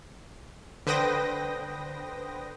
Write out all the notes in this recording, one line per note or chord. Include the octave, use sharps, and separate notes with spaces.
D3 B4 C5 G5 D#6 A#6